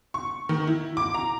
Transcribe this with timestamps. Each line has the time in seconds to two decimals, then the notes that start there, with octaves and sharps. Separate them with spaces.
0.14 C#6
0.49 D#3
0.67 E4
0.97 D6
1.14 A#5